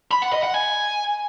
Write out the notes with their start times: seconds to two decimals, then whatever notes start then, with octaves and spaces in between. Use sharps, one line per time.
0.11 B5
0.22 F#5
0.33 D#5
0.43 F#5
0.54 G#5